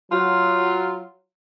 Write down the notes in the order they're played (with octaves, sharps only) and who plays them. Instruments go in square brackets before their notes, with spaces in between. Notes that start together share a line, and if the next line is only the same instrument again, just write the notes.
[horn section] F#3 F4